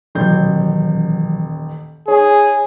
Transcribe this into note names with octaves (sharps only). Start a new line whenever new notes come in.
D#1 A1 B2 E3 F#3 G6
D#4 G#4 C#5